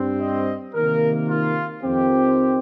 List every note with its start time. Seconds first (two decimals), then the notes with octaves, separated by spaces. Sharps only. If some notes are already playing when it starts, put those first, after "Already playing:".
Already playing: G2 G3 C4
0.21 D#5
0.75 C3 D#3 A#3 A#4
1.29 F4
1.83 F2 D#3 C4 G4